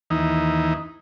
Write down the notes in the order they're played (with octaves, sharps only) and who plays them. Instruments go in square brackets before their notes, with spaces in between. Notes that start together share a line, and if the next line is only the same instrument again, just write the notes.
[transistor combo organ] D#2 E3 D#4